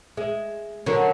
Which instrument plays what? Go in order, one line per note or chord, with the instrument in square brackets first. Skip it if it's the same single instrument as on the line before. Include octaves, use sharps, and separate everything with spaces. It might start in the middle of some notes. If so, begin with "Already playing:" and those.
[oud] G#3 [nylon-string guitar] E5
[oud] D3 F#3 [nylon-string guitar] D4 A#4